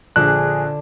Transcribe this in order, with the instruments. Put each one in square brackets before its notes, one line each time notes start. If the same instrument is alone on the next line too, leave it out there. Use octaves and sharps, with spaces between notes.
[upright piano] A#1 [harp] D3 [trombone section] G#4 [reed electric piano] F#6